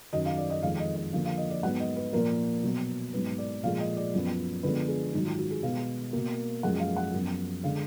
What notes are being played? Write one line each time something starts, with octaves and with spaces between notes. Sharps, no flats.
F#2 D#3 F#3 D#5
F5
D5
D#5
F2 D#3 G#3 F5
D#5
D#5
D3 F3 A#3 F5
F5
D#5
D5
G#2 F#3 B3 F#5
D#5
B4
A#2 F3 A#3 A#4
B2 F#3 B3
G#2 F#3 B3 B4
D5
A#2 F3 G#3 F5
D#5
D5
F#2 F3 B3
D3 F3 G#3 B3 B4
G#4
G#2 D#3 F#3 D#4
F4
F#4
G#4
B2 G#3 B3 F5
B2 A#3
F#2 F3 G#3 F#5
F5
F#5
F#2 F3 B3
D3 G#3 F5